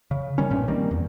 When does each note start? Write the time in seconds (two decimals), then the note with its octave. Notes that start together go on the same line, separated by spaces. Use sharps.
0.11 C#3
0.38 D#3 G3 C#4
0.50 B1 G2 A#2 C#4
0.68 D#3 G3 A#3 C4
0.91 E2